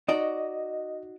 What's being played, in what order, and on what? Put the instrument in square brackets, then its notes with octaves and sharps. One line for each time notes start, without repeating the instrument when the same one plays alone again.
[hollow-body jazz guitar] D#4 F#4 D5 [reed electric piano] D#5